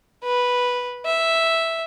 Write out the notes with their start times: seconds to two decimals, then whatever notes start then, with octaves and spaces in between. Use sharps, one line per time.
0.24 B4
1.06 E5